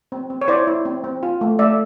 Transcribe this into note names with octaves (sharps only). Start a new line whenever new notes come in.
C4
C4
C#5
E4 C5 D5
E4
C4
C4
F4
A3
A3 D5 E5